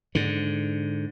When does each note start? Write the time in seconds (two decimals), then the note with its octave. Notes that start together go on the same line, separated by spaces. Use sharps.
0.15 G#2 D3